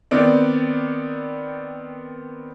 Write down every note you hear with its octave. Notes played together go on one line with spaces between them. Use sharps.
D#3 B3 C4 D5